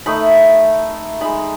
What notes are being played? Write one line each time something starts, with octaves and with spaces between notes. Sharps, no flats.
A3 D#4 B5
G#3 D#4 B5